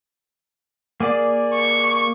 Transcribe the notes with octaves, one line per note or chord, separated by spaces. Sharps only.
A#3 G#4 D5
C#6